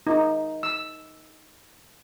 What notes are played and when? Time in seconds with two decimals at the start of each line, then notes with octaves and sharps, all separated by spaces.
0.07 D#4
0.63 E6